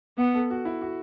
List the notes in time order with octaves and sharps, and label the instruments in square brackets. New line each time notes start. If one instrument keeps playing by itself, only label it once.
[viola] B3 [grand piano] F#5
[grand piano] A4
F#4
E4
F#4